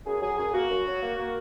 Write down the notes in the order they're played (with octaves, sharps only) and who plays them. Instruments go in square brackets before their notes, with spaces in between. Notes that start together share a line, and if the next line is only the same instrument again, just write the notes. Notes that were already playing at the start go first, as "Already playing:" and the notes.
[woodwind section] F#2 G#4
F#3 G#4
F#2 G#4
A#3 F#4
F#2
F#3
A#3
A#3